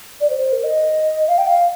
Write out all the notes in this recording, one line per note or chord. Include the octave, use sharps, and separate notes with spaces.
D5
C5
C5
A#4
D#5
F5
G5
F5